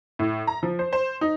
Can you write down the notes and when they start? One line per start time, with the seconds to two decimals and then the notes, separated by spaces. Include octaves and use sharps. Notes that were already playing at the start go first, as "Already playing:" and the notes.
0.19 A2
0.47 A#5
0.63 F3
0.79 C5
0.93 C5
1.21 D#4